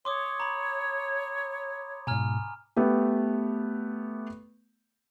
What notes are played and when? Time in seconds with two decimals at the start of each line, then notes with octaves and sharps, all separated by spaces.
0.05 C#5 C6 D6 D#6
0.40 A#5 B5
2.07 G#2 B2 G#5 A#5 F6
2.76 A3 B3 G4